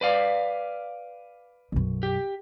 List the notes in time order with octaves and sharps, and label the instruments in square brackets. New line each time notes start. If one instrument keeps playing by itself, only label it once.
[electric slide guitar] B4 D5 F5
[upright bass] B1 F#2
[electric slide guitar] G4